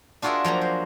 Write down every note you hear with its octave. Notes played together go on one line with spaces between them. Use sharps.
D4 F4 F#4 G#4 A#4 E5
F3 F#3 A#3 A#5
C5